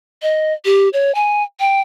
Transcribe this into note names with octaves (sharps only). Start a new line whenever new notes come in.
D#5
G4
C#5
G#5
G5